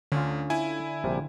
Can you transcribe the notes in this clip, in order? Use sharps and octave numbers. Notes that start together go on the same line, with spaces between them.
D2 D3 C#4 F4
E4 G#5
A#1 C3 G3